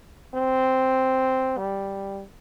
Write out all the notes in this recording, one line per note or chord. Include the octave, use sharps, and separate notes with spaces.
C4
G3